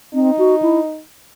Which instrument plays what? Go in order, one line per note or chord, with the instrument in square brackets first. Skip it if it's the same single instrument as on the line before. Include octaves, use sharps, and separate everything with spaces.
[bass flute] C4 [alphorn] D#4
[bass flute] F#4
E4